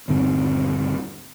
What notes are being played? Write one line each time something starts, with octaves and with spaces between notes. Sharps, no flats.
D#1 G2 D3 C4